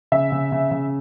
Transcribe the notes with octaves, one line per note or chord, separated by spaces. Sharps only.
C#3 E5
C#3
C#3
C#3